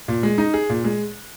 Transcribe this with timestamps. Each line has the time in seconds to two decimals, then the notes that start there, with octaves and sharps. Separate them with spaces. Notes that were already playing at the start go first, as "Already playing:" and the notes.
0.08 A#2
0.23 G#3
0.38 D#4
0.54 G#4
0.70 A#2
0.84 G#3